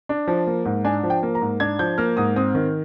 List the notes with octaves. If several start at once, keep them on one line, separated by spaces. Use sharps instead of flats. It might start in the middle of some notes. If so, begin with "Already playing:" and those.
D4
F3
A#3
G#2
D4 G#5
F3
G5
A#3
A#5
G#2
D4 G#6
F3 G6
A#3 F6
G#2 D#6
C4 D#6
D#3